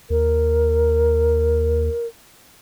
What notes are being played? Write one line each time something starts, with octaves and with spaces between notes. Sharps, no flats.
D#2 A#4